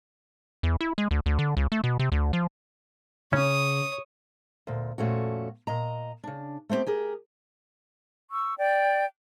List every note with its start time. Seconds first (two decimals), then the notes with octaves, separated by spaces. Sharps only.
0.63 E2
0.81 E4
0.98 G#3
1.11 D2
1.26 D2
1.39 D3
1.57 C#2
1.72 A3
1.84 B2
1.99 C3
2.12 D2
2.33 F3
3.33 C#3 C#4 C#5 D#6
4.67 D2 A#2
4.98 F2 A#2 A3 C#4 F#4
5.67 A#2 D#5 A#5
6.24 C#3 D4
6.69 A3 B3 C4 D4 G4
6.86 G4 G#4 A#4
8.30 C#6 E6
8.58 D5 G5